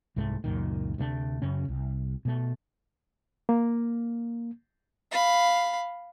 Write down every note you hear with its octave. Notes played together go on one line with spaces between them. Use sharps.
C2 G#2 A3
C#2 F#2 A#2 D#3
D2 C3 A3 D4
F#2 C#3 C#4
C2
B2 A3
A#3
F5 B5